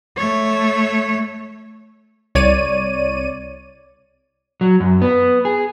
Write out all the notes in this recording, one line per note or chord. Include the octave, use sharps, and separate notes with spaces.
A3 C#5
C2 C#5 D5 D#7
F#3
F#2
B3
G#4